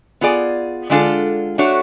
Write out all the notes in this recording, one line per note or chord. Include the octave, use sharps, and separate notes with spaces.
B3 F4 G#4 D5
D3 G#3 D4 F4 A4
A3 D4 F#4 C#5